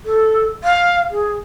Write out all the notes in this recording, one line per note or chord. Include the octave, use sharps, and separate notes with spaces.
A4
F5
G#4